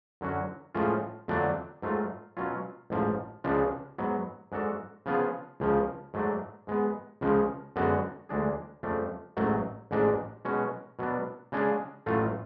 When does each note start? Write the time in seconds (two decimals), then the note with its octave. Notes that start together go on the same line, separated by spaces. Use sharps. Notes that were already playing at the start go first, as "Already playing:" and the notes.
0.21 F#2 D3 F#3 C#4 F#4
0.75 A2 F3 G#3 C#4 F4
1.28 F2 D3 F#3 A3 D4
1.82 G#2 F#3 A3 F4
2.37 B2 F#3 C#4 F4
2.90 A1 G#2 F3
3.44 C#2 C#3 F3 G#3 D4
3.98 G#2 F#3 B3
4.52 G#2 G#3 D4 F#4 A4
5.06 C#3 F3 B3 F4 G#4
5.60 C#2 C#3 F3
6.14 G#2 F#3 A3 D4
6.67 G#2 G#3 B3
7.21 C#2 C#3 F3 G#3
7.76 F#2 D3 G#3 B3 F#4
8.29 D2 D3 G#3 D4 G#4
8.83 F2 C#3 F3 A3 D4
9.37 A1 G#2 F#3 A3
9.91 A1 G#2 G#3 D4
10.45 B2 G#3 C#4 F#4
10.99 B2 F#3 B3 D4
11.52 C#3 G#3 D4 G#4
12.06 A1 A2 F#3 A3 F4